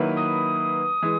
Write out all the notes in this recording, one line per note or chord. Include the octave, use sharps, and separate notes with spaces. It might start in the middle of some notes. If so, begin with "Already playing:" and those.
Already playing: D#3 F#3 A#3 E4 B4
D#6
E3 G#3